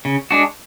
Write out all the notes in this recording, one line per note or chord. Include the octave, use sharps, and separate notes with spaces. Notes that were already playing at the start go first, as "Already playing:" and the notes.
C#3
G#3 D4 F#4